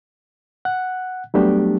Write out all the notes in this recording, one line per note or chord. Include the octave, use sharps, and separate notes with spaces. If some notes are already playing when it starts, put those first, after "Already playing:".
F#5 F#6
F#3 G3 A3 B3 D4 G4